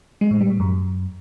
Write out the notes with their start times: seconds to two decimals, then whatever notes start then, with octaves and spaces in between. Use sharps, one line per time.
0.21 G#3
0.31 A2
0.41 G3
0.50 A2
0.60 F#2